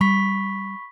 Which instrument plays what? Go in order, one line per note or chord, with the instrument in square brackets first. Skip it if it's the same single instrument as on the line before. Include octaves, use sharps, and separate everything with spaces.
[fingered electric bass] G3 [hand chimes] B5 C#6 B6